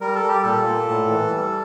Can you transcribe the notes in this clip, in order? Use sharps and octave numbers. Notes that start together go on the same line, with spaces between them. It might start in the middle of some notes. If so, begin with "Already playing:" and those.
G3 A#4
A4
G3
G4
A#2 A4
A#2
A2
E3
G3